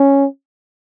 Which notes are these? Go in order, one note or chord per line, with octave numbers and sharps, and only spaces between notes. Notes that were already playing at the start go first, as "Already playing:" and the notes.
Already playing: C#4